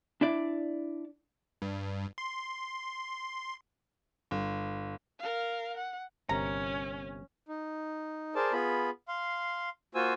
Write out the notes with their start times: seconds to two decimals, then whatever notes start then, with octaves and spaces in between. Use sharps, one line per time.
0.21 D4 E4 D5
1.62 G2
2.18 C6
4.31 G1
5.19 A#4 F5
5.77 F#5
6.29 G1 C3 C#4 A#4 A#5
7.48 D#4
8.35 G#4 A#4 C5 D5 A5
8.53 B3 F4 G#4 B5
9.08 F5 C6
9.95 A#3 F4 F#4 C5 G#5 E6